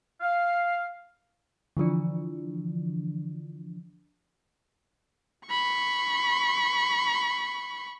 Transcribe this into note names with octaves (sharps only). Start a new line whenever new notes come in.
F5
D3 E3 F3 D4
B5 C#6